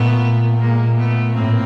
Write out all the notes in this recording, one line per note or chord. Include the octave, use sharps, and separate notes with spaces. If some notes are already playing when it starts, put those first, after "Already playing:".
Already playing: A#2 A3 B3
G#3 A#3
A3 B3
A2 A#3 C4